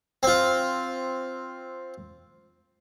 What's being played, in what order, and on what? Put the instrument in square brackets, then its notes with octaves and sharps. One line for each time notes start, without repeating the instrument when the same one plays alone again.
[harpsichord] C4 F4